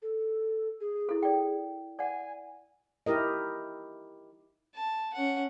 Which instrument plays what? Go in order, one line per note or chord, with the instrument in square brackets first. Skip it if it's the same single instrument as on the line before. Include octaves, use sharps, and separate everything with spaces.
[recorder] A4
G#4
[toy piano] E4 A4
D5 G5
[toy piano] D5 F#5 [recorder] G#5
[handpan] D#4 E4 G4 A#4 D#5
[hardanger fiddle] A5
C#4 F#5